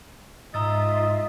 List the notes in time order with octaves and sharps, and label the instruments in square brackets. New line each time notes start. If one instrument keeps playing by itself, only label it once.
[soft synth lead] G#2 [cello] F4 E5 [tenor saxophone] D#5 [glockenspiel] A#5 E6 A6